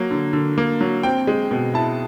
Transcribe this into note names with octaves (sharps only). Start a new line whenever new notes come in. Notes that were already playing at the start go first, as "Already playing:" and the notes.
Already playing: F#3 A#3
D3
D3
A#3
F#3
C4 G5
G#3
B2
E4 A5